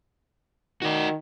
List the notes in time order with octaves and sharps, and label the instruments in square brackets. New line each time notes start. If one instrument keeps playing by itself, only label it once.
[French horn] D#3 [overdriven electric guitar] F#4 D5